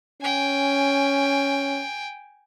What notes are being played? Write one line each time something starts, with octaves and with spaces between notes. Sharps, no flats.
C#4 G5 G#5